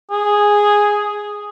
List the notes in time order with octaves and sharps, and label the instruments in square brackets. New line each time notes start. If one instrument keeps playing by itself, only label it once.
[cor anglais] G#4